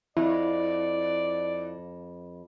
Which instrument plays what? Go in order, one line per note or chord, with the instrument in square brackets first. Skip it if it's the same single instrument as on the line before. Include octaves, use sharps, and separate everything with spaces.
[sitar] F2 [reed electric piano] E4 [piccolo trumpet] D5